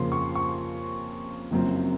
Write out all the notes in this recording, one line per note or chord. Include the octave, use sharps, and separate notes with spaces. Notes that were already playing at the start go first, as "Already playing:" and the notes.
Already playing: F2 C#3 F3 A#3 C6
C#6
C#6
F#1 F#2 F3 C4